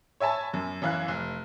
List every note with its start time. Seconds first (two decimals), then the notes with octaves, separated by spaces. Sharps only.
0.20 C#5 E5 G#5 A5 B5
0.54 F#2
0.82 F#2 E3 E4 F5 F#6
1.08 F1